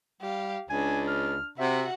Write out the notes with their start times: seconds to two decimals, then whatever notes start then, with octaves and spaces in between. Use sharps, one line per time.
0.21 G3 G4 F5
0.70 C#2 D4 G#5
1.08 F6
1.58 C3 F#4 E5 F#5